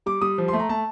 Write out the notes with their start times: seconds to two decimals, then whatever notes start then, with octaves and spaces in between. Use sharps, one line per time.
0.06 G3 D6
0.21 G3 D#6
0.38 F3
0.48 C6
0.53 A3
0.60 A#5
0.69 A3 A5